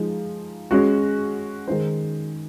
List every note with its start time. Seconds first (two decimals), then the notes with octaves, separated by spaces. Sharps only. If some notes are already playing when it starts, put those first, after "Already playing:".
Already playing: F3 G#3 D#4
0.71 G#3 C#4 F#4
1.68 D#3 G#3 D#4 G#4 C5